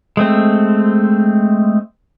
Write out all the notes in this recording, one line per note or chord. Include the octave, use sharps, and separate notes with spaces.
G#3 A3 C4